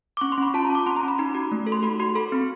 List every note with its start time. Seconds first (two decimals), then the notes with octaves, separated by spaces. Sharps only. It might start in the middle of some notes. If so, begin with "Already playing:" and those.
0.17 D6
0.21 C#4 C#6
0.32 C6
0.38 C#4 B5
0.54 F4 A5
0.65 A#5
0.70 F4 D6
0.86 C#4 C6
0.96 A#5
1.03 C#4
1.08 B5
1.18 D#4 B5
1.35 F#4
1.52 A3
1.67 A4
1.72 C6
1.83 F#4 B5
2.00 F#4 C6
2.15 A4 B5
2.32 C4